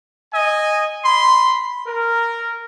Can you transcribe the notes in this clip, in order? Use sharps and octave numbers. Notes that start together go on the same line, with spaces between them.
D#5 G#5
B5 C6
A#4